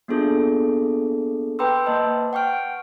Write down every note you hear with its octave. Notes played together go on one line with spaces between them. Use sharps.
A#3 B3 D4 F4 G#4 A4
B4 G5 A#5 C6 D6 E6
A#3 B4 C5 D#5 A5
F#5 G5 C#6 F6 D7